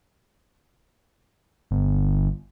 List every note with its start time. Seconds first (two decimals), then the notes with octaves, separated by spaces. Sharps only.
1.71 G1